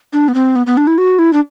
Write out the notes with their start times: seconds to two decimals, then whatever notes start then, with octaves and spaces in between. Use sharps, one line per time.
0.13 D4
0.28 B3
0.34 C4
0.56 B3
0.67 B3
0.77 D4
0.87 E4
0.98 F#4
1.19 E4
1.33 D4